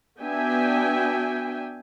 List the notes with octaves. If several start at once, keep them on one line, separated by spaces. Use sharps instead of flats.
B3 D4 F#4 E5 G5 G#5